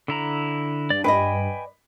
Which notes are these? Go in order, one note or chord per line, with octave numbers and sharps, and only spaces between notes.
D3 E4 A#5
G2 D5
B4 D5 D#5 G5 G#5 B5